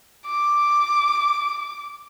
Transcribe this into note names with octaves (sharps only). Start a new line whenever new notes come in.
D6